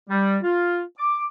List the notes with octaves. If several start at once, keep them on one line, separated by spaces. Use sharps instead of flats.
G3
F4
D6